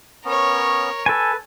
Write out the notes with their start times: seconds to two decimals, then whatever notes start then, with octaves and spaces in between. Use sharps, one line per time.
0.25 B3 C#4 A#4 C#5
1.06 A4 B4 G#5